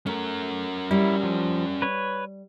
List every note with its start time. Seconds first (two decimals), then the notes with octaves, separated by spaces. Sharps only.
0.07 A3 C#4 A#4
0.91 G3 E4
1.23 F3
1.82 B4 C#5